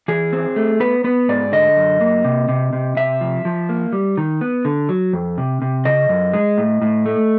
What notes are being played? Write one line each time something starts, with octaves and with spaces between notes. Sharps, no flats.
E3 G#4
C4
A3
B3 B4
B3 B4
G#2 D5
D3 D#5
F#2
A#3
C3
C3
C3
C3 E5
F3
F3
A#3
G3
D#3
B3
D3
F#3
F2
C3
C3
C#3 D#5
F#2
G#3
A2
A2
A3